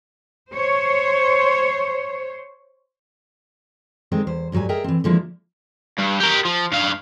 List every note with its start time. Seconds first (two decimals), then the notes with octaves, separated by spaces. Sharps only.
0.53 C5 C#5
4.12 D#3 G#3 C4
4.27 E2 C5
4.52 D2 G#2 F#3 G3 G#5
4.69 G#4 A#4 D#5 E5 G5
4.84 E3 C4
5.04 D3 E3 F3 G#3 A#3 E4
5.99 G2
6.20 G4 A#4
6.45 F3
6.72 G2 F5